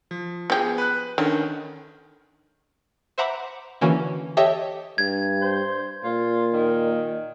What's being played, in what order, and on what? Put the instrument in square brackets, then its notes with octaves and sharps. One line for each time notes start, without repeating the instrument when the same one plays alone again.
[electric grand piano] F3
[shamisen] F3 G4 [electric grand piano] B3 G#4
[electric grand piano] B4 F#6
[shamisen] D3 [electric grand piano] D#3 C#4 A#4
[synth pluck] C5 E5 F#5 A#5 B5 D6
D3 E3 A#3 C#4 F#4
G4 A4 C#5 D#5 E5 G5
[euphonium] G2 [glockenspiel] G#6
[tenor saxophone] C5
[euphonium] A#2 [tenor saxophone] F4
[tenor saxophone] D#3